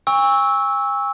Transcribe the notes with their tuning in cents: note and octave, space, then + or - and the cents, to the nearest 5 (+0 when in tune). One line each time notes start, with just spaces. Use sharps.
G#5 -45 C#6 +0 E6 -15